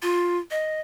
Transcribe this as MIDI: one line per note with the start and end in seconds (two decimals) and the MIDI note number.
0.02 0.38 65
0.51 0.80 75